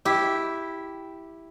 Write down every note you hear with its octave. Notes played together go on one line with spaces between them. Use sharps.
E4 G4